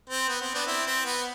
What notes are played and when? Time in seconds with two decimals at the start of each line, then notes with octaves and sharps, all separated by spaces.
0.10 C4
0.29 B3
0.41 C4
0.55 B3 D4
0.67 C4 E4
0.87 C4
1.05 B3